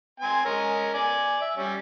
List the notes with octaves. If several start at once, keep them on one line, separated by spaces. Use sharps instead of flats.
C4 G#5
G#3 C#4 A#4
D5 G#5
E5
G3 C#4